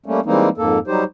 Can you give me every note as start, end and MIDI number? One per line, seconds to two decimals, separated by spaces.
0.06 0.20 55
0.06 0.20 57
0.06 0.20 58
0.06 0.20 61
0.25 0.49 52
0.25 0.49 55
0.25 0.49 56
0.25 0.49 58
0.25 0.49 60
0.25 0.49 63
0.58 0.79 41
0.58 0.79 44
0.58 0.79 58
0.58 0.79 69
0.87 1.04 54
0.87 1.04 55
0.87 1.04 63
0.87 1.04 67
0.87 1.04 72